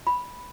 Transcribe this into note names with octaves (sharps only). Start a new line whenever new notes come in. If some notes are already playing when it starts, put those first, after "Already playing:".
B5